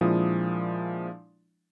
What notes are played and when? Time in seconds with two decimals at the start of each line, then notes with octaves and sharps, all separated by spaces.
0.01 A#2 F3 G#3 D4 E4 D#6